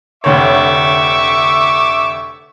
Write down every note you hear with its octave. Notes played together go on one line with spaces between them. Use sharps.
F1 D2 C#5 E5 C#6 D6